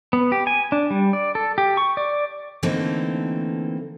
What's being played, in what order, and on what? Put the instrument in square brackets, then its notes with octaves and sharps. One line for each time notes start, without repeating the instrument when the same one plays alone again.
[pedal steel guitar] B3
G4
G#5
D4
G3
D5
A4
G4
C#6
D5
[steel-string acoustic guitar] D3 E3 A3 A#3 C4 D#4